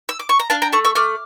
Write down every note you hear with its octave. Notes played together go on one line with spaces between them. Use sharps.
E6
D6
C#6
A#5
D4 F5 A5
G5 A#5
A3 A5 C#6
C#6 E6
A3 D6 F6